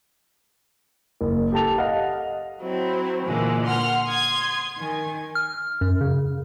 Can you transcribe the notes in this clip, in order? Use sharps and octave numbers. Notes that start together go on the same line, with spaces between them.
F#1
G4 A4 A5 F7
D#5 F5 F#5
F#3 C4 E4
A#2 D3 E3 G#3 A#3
F#5 C6 F6
C6 D#6 G#6
D#3 G#5
F6
F#2
C#3